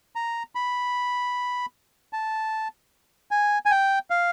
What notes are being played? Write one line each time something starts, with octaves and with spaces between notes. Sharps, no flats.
A#5
B5
A5
G#5
G#5
G5
F5